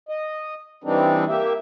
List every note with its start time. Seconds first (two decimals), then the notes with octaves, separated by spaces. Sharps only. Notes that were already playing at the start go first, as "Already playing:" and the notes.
0.09 D#5
0.84 E3 G3 C4 D4 D#4
1.28 A#3 G4 E5